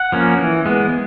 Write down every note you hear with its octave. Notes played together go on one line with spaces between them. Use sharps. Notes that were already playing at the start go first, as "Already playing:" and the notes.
Already playing: F#5
F3 A#3 C#4
E3
G#3 B3